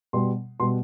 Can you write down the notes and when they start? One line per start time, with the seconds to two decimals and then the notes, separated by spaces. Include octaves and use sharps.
0.13 B2 G3 C6
0.60 B2 G3 C6